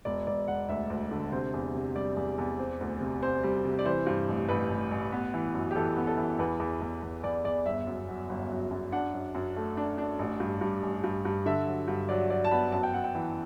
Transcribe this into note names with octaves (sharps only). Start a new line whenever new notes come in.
E1 D5
E1 D5
E1 F#5
D2 E5
D2
D3
C3 C5
E2
C3
G3 D5
E2
E2
C4
D2
C3
C4 C5
G3
C3
D5
E3 C5
G2
A1
A1 B4
A1
A1
B3
E3
F#2
G4
E3 A4
B3
A4
E3
E2 B4
E2
E2
E2
E2 D5
E2 D5
G1 E5
F#2
F#3
G1
F#3
F#2
D4 F#5
F#2
F#2
A3
D4
D4
A1
G2
G2
A1
G2
G2
D3 E5
F#3
G2
F#3 D5
F#3 D5
A5
B3 B5
F#2 A5
G5
F#2 F#5
G5
E3